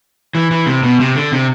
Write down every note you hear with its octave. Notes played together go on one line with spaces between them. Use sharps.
E3
E3
C3
B2
C3
D3
C3